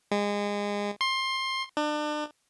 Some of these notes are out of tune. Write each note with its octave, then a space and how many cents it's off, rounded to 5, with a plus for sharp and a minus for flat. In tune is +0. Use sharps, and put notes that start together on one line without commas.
G#3 -25
C6 +20
D4 +35